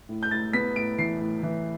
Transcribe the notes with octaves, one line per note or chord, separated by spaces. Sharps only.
A2
G6
A2 A6
B3 B6
A2 D7
E3 C7
A2
E3